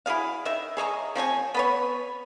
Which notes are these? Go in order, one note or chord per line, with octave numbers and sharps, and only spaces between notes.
E4 F#4 G#4 F5
D#3 E5
G#4 C#5 D#5 A#5
F3 C4 C#5 G#5
B3 B4 C#5